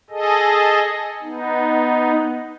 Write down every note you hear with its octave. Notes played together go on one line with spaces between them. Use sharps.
G#4 A4 D#5
B3 D#4